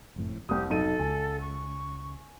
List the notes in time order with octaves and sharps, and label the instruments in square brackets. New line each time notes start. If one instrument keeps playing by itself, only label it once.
[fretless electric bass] F#1 F2 A2
[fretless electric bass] F1 [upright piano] C2 D#6 [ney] G4
[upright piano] B1 D#4 D#7 [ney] A4
[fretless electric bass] C#2 [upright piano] G#5
[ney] C#6